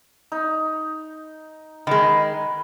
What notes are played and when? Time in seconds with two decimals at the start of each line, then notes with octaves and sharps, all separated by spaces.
0.32 D#4
1.87 D#3 G#3 B4